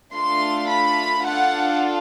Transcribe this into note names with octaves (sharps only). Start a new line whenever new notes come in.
A3 D4 F4 A4 C6
B5
D4 F4 A4 F#5